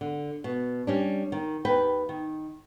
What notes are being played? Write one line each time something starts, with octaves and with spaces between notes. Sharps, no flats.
D3
B2
G3 C#4 D4
D#3
D#2 B4 G5
D#3